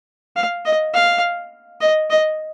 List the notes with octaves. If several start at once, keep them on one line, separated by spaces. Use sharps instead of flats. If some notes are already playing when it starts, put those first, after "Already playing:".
F5
D#5
F5
D#5
D#5